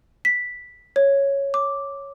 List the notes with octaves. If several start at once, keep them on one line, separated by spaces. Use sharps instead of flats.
B6
C#5
D6